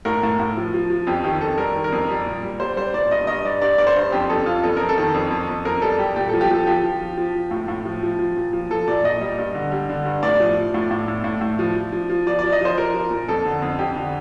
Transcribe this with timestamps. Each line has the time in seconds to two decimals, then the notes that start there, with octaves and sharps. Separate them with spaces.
0.05 A2 A#4
0.23 A2
0.40 A2
0.57 F3
0.74 F3
0.90 F3
1.07 F2 G4
1.24 D#3 G4
1.41 F2 A4
1.58 G3 A#4
1.76 D#3
1.84 A#4
1.92 F2
2.09 G3
2.26 A#2
2.43 G3
2.60 G3 C5
2.76 G3 C5
2.94 A#2 D5
3.11 G2 D#5
3.27 G2 D#5
3.45 G2 D5
3.62 G2 D5
3.78 G2 D5
3.87 C5
3.96 G2
4.12 F2 G4
4.30 F2 A4
4.46 F2 F4
4.63 F2 A4
4.77 F2 A#4
4.89 A4
4.98 D#3
5.14 F2
5.31 F2
5.48 F2
5.65 F2 A#4
5.82 G3 A4
5.98 G3 G4
6.16 A#2 G4
6.29 F3 A4
6.41 G4
6.51 F3 A4
6.66 F3 G4
6.84 F3
7.01 F3
7.17 F3
7.35 F3
7.51 A2
7.68 A2
7.85 F3
8.03 F3
8.19 F3
8.37 A#2
8.53 F3
8.70 F3 A4
8.88 A#2 D5
9.04 A#2 D#5
9.21 G3
9.38 G2
9.55 D3
9.71 G3
9.89 D3
10.05 G2
10.23 A2 D5
10.40 F3
10.57 F3
10.74 A2
10.91 A2
11.08 A2
11.24 A2
11.41 A2
11.59 F3
11.76 F3
11.92 F3
12.10 F3
12.27 F3 D5
12.39 F3 D5
12.52 D#5
12.61 F3 C5
12.78 F3 A#4
12.94 F3
13.11 A#2
13.28 F2 A4
13.45 D3
13.62 F2
13.79 F2 G4
13.96 D3